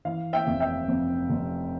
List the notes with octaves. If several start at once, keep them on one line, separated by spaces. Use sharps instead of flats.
E3 F5
E5 G5
F1
E5 G5
F2
F1